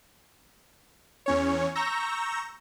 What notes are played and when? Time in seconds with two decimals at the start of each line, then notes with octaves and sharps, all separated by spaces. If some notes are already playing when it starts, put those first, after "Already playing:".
1.26 E2 C#4 C#5
1.75 A#5 C#6 E6 G6 A#6